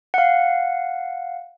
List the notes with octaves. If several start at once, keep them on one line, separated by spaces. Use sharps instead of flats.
F5 F#5